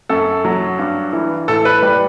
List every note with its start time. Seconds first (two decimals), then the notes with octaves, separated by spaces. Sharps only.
0.09 F#2 A4
0.45 F#3
0.79 G2
1.13 E3
1.48 A2 A4
1.65 B4
1.83 G3 B4